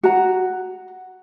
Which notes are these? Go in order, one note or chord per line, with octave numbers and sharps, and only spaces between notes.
F#4 A#5